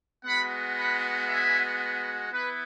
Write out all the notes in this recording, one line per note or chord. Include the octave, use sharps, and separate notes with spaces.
G#3 B3 F#4 F#5 B5
F#5 B5
E5 G#5
B3 E4 B4